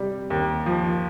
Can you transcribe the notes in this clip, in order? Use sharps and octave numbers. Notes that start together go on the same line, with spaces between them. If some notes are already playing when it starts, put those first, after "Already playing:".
Already playing: C3 G3
D#2
F3